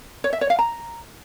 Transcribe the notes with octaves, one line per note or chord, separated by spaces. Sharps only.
C#5
E5
C#5
F5
A#5